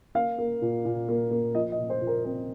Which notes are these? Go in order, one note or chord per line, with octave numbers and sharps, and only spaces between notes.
A#3 F5
A#3
A#2
A#2
A#3
A#3
F3 D#5
D#5
A#2
C5
A#2
A#4
C4 A#4